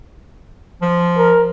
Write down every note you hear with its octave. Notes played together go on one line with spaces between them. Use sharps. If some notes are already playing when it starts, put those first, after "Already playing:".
F3
A#4